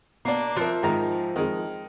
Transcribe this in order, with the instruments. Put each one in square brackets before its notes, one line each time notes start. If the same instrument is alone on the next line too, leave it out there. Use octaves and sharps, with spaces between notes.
[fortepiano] B2 [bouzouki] A#3 D4
[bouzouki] F3 E5 [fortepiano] A#4 F#6
[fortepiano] G#2 D#3 A#5
D#3 G#3